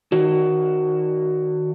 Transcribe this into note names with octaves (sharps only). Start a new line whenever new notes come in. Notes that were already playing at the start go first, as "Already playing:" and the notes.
D#3 F#4